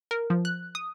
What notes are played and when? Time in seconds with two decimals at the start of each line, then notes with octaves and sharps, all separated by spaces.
0.11 A#4
0.30 F3
0.45 F#6
0.75 D#6